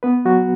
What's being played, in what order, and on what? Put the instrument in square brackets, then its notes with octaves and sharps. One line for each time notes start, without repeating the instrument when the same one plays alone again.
[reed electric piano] B3 B4
F#3 F#4